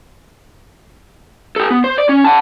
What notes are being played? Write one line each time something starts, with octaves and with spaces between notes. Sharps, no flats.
G4 A4
B3
C5
D5
C#4
F#5 A5